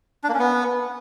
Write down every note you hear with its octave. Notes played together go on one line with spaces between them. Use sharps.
D4
A#3
C#4
B3